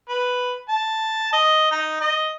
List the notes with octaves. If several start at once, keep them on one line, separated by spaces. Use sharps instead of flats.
B4
A5
D#5
D#4
D#5